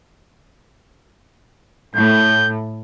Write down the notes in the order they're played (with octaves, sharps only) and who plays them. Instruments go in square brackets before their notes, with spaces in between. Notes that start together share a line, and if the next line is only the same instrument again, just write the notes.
[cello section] A2 [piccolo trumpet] G6